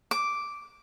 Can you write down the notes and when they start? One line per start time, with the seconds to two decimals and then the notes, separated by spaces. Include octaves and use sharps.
0.11 D6